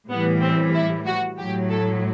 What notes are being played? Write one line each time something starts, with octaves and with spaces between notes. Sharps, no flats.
A2 E3 G3 B3
C4
E4
F#4
A2 F#3 G4
A4